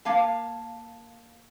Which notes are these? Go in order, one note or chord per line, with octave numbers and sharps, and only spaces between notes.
A#3 F5 A5